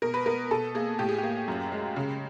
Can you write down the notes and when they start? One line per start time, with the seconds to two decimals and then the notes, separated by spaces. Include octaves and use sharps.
0.02 B2 A#4
0.14 B4
0.26 B3 A#4
0.51 B2 A4
0.75 A#3 G#4
0.99 A2 G4
1.09 G#4
1.18 A#3 G4
1.48 F#2
1.72 G#3
1.96 C#3